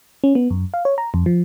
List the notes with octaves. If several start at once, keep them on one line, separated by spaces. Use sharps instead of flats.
C#4
B3
F#2
F5
C#5
A#5
F2
F3